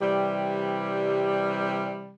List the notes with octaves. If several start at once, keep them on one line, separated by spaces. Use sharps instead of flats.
C3 E3 G3